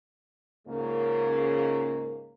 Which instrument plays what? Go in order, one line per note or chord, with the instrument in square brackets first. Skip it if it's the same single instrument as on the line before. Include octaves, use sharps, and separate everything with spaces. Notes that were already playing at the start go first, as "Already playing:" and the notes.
[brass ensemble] C#2 G#2 C#3 A#3